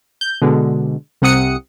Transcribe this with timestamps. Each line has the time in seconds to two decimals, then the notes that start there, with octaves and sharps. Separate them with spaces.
0.21 G6
0.42 B2 D3 G#3
1.22 C2 C3 F#5 D#6 C#7